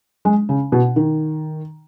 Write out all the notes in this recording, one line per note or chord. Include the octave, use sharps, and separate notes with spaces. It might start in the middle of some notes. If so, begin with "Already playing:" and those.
G#3
C#3
B2
D#3